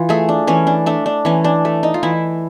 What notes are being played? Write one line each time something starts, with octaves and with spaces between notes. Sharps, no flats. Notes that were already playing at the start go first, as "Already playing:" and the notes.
Already playing: E3 F4
A3 G#4
D4
E3 C#4
D4
A3 D4
D4
E3 C#4
D4
A3
D#4
F4
E3 E4